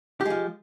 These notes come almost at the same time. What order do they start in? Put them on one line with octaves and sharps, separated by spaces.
G4 G#3 F3